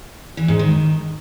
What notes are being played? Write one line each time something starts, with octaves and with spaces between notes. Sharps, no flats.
E3
G#2
D#3